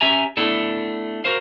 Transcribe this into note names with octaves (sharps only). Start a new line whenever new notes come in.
C#4 G4 E5 G#5 A#5
A3 B3 D4 E4 A4
F#4 A#4 C5 F5